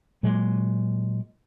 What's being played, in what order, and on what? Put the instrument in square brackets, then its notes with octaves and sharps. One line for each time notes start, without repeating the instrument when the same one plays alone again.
[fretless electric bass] A#2 F#3 G#3